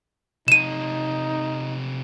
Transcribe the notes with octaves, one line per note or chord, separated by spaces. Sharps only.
C3 D#4 A4 D#7 E7